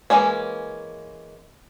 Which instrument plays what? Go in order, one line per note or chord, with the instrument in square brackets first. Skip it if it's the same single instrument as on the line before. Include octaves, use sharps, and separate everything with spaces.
[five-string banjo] E3 G#3 A#3 C#4